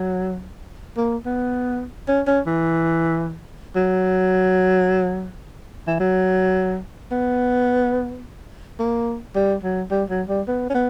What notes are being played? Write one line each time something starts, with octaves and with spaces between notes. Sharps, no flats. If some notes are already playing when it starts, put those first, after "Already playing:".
Already playing: F#3
A#3
B3
C#4
C#4
E3
F#3
E3
F#3
B3
A#3
G3
F#3
G3
F#3
G3
B3
C#4
B3